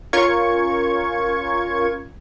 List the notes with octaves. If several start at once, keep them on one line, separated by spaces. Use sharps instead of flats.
C#4 F4 A#4 C#6 G#6